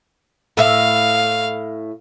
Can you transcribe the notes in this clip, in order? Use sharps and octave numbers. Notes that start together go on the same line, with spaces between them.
A2 E5 F5